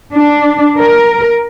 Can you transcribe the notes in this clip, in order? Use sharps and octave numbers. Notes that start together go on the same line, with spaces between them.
D4
A#4